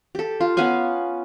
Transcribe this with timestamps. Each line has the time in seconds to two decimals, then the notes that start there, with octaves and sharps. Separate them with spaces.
0.15 G4 A4
0.40 F4
0.57 B3 C#4 F5 G#5